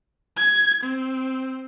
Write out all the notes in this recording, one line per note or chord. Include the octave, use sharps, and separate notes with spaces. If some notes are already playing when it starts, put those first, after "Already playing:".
G#6
C4